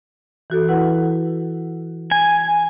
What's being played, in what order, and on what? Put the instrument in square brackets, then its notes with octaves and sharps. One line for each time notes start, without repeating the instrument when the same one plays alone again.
[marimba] E3 F#4 A4
E4 B4 F#5
[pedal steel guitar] G#5